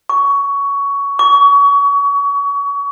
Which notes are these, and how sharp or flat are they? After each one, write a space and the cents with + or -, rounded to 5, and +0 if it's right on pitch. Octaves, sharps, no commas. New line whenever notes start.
C#6 +15
C#6 +30